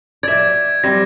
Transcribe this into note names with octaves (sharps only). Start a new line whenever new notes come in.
D5 E5 G#6
G3 C4 A#6